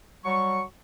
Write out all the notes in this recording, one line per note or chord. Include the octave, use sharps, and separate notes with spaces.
F#3 G3 C#6